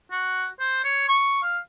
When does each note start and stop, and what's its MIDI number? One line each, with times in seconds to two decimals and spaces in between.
0.11 0.47 66
0.60 0.84 72
0.84 1.04 73
1.08 1.39 85
1.43 1.58 77